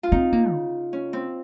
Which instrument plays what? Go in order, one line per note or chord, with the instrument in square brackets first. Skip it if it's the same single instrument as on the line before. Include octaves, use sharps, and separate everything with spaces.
[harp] F4
[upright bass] C4 [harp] D#4
[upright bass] A#3
C#3
[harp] C#4
C4